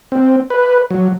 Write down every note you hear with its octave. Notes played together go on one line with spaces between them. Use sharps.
C4
B4
F#3